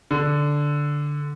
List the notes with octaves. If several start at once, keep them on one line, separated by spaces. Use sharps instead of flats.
D3